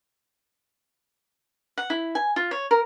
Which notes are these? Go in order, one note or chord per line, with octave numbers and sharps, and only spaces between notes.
F#5
E4
G#5
F4
C#5
A#4